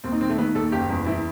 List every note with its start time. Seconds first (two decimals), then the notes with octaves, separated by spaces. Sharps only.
0.04 D#2 C4
0.12 D#4
0.21 D#3 C4
0.29 A3
0.38 D#3 B3
0.55 D#2 A4
0.72 F#1 G4
0.89 E2
1.06 E3 E4